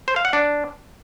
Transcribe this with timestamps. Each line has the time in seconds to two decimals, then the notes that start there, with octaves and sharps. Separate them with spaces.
0.08 C5
0.16 F5
0.25 F#5
0.33 D4